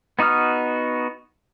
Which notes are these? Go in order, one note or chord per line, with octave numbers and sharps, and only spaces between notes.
B3 D#4 F#4 D#6 F6